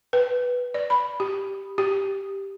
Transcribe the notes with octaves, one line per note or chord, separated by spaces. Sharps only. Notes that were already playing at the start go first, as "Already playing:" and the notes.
B4
D5
B5
G4
G4